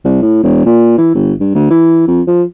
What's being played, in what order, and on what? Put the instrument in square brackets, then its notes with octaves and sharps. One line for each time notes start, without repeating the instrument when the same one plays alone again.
[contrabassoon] C2
A2
E1
A#2
E3
G1
G2
D2
E3
F2
F3